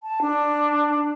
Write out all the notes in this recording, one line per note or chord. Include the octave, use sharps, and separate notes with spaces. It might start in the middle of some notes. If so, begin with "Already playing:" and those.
A5
D4